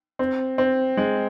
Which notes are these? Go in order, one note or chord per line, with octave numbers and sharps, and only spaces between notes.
C4
C4
G#3